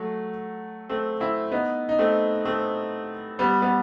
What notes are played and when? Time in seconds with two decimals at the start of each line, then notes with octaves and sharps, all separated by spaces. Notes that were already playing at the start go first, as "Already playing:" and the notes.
Already playing: F#3 A3
0.89 A3 C4
1.20 C4 E4
1.51 B3 D#4
1.89 D#4
1.99 A3 C4
2.45 A3 C4
3.39 G3 B3
3.62 G3 B3